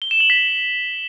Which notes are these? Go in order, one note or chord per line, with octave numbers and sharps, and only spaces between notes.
G7
E7
F#7
B6